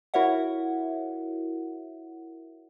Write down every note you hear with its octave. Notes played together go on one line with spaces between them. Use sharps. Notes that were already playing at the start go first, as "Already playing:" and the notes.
E4 F#4 A#4 C#5 E5 F#5